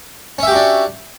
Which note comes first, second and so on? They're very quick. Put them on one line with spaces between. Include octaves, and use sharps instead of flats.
C#4 E5 G4 F#4 D4